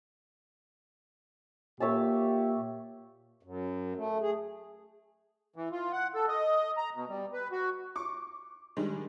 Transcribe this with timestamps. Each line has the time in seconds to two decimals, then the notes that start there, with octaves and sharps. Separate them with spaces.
1.80 A#2 F4 G4 C#5 E5 A5
3.43 F#2
3.96 A3
4.21 G#4
5.56 E3
5.72 F4
5.93 F#5
6.15 A4
6.28 D#5
6.77 A#5
6.95 B2
7.09 G3
7.33 B4
7.52 F#4
7.96 C#6 D6
8.77 D#3 G3 G#3 D4